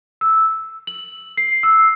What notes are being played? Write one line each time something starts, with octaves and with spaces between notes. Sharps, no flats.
E6
F#7
C7
E6